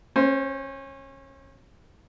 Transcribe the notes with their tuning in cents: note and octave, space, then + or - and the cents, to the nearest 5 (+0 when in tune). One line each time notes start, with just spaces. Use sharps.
C#4 -30 C5 +0